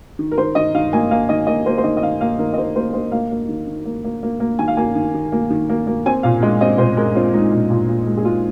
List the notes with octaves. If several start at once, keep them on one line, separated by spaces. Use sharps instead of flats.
D#3
A#4
D#3 C5
D#3 D#5
D#3 F5
A#3 G#5
A#3 F5
D#3 D#5
A#3 D#5
A#3 C5
C5
D#3 D#5
D#5
D#3 F5
A#3 F5
D#3 A#4
D#5
D#3 C5
A#3 C5
A#3 C5
A#3 F5
A#3
D#3
D#3
A#3
A#3
A#3
A#3
D#3 G#5
F5
A#3 G#5
D#3
D#3
A#3
D#3
A#3
A#3
C4 G#5
A#2 F5
G#3 D#5
C4 D#5
A#2 C5
G#3 A#4
C4 F4
G#3 D#4
A#2
A#2
A#2
G#3
G#4
G#3 F4